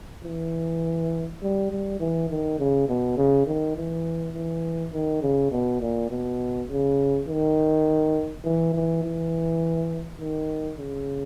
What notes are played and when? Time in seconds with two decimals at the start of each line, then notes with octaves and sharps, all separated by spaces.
0.25 E3
1.42 G3
1.71 G3
2.00 E3
2.30 D#3
2.59 C#3
2.88 B2
3.17 C#3
3.46 D#3
3.76 E3
4.34 E3
4.93 D#3
5.22 C#3
5.52 B2
5.81 A#2
6.10 B2
6.68 C#3
7.28 D#3
8.44 E3
8.74 E3
9.04 E3
10.20 D#3
10.78 C#3